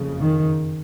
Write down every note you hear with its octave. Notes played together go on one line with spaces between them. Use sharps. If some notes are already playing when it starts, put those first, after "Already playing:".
Already playing: F#1 F2 C#3
D#3